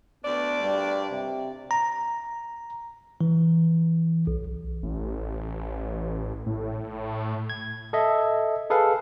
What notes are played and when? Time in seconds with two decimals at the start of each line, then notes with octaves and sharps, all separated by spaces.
0.24 D2 B3 D4 D5
0.59 G2
1.10 C3
1.71 A#5
3.21 E3
4.27 B1
4.83 A1
6.46 A2
7.50 G#6
7.93 A4 D#5 E5
8.70 G#4 A4 B4 F5